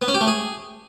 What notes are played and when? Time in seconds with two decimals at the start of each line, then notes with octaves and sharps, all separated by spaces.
0.02 B3
0.08 C#4
0.14 G4
0.21 A3
0.27 G#4